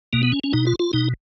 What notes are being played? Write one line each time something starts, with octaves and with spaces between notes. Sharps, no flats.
B2 A#3
B3
C#4
C#4
B2 D#4
F4
F4
B2 D#4